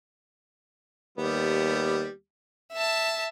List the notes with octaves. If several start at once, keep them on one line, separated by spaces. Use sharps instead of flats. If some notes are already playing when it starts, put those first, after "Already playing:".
D#2 G3 B3
E5 A5